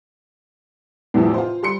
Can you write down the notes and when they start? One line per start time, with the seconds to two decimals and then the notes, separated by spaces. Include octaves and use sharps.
1.14 E2 A2 C3 E3 F3
1.34 F4 C5
1.63 G3 C6 C#7